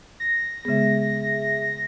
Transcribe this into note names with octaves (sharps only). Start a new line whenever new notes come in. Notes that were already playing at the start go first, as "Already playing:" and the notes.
A#6
C#3 G#3 B3 G#4 E5